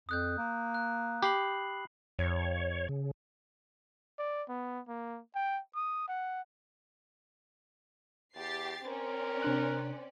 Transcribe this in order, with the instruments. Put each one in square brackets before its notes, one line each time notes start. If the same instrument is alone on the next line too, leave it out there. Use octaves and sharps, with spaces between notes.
[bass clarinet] F2 [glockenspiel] D#6 F#6 G6
[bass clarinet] A#3
[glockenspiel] F#6
[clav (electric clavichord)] G4 [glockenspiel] B5 C7 F#7
[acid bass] F2 [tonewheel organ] C#5
[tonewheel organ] C#3
[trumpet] D5
B3
A#3
G5
D#6
F#5
[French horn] E2 [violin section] G4 A6 C7
[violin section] C4 C#4 D5 [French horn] A#4
[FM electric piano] C3 D4 F#6